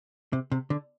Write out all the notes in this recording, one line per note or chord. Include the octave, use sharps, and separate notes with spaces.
C3
C3
D3